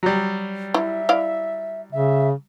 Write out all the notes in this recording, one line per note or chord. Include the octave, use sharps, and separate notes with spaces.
F#3 G3
E4 E5
E4 D5 F5
C#3 E5